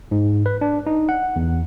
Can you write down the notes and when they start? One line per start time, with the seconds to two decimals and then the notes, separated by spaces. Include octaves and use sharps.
0.11 G#2
0.46 B4
0.61 D4
0.86 D#4
1.09 F#5
1.36 E2